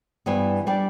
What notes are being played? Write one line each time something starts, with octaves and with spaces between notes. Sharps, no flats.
G2 E3 G3 B3
G3 D4 G4 D5